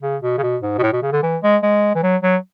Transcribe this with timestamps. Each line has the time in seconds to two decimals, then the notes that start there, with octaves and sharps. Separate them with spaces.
0.03 C#3
0.23 B2
0.38 C#3
0.43 B2
0.62 G#2
0.78 B2
0.83 A2
0.92 B2
1.02 C#3
1.12 D3
1.23 E3
1.43 G#3
1.63 G#3
1.95 E3
2.03 F#3
2.23 F#3